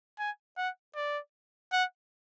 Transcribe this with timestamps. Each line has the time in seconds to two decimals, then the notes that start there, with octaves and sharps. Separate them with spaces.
0.19 G#5
0.58 F#5
0.96 D5
1.73 F#5